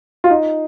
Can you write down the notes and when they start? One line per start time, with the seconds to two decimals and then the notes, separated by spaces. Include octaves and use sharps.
0.24 F4
0.30 D#4